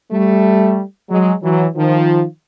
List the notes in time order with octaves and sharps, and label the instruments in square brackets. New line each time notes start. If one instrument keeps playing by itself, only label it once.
[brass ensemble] G3 A3
F#3 G#3
E3 F#3
D#3 F3